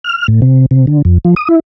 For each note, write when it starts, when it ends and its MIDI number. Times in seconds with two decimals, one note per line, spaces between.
0.04 0.27 89
0.28 0.41 45
0.42 0.66 48
0.71 0.86 48
0.87 1.02 50
1.05 1.18 41
1.25 1.34 53
1.36 1.48 87
1.48 1.59 64